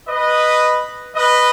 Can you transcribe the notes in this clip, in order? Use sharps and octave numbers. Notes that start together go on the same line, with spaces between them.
B4 D#5
B4 D#5